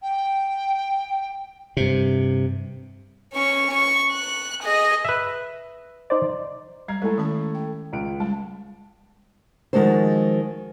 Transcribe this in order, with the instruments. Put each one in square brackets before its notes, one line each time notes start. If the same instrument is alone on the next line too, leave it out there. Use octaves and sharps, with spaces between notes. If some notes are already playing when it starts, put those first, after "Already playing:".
[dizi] G5
[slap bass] G2 C3
[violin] C#4 C#6
C#6
F#6
G#4 D#5
[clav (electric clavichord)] B4 E5
[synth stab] D#4 C5 D5
[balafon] G3 [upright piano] A#5 G#6 C7
[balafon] G#3 [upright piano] A3 E4 A4
[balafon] D#3 C#4 A5
G5
[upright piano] C#2 D7
[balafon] G3 G#3 [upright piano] A5
[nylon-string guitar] D#3 F3 G#3 F#4 A4 C5